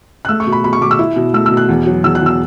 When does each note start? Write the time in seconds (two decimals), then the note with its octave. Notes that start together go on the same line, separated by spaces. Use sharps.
0.25 F#6
0.29 A3 E6
0.40 C#6
0.47 B2
0.52 B5
0.64 B2 B5
0.73 C#6
0.81 B2 D6
0.91 E6
0.99 E4
1.16 B2
1.34 A3 E6
1.46 E6
1.51 B2
1.57 F#6
1.69 E2
1.86 F#3
2.04 E2 E6
2.15 F#6
2.21 E2 E6